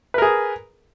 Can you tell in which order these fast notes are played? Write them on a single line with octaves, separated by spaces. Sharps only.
B4 A#4 G#4